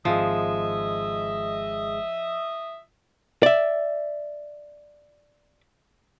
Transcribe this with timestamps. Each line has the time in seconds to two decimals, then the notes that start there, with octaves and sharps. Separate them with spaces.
0.05 G#1 F3 G#3 G#4 D#5 E5
3.43 D5 E5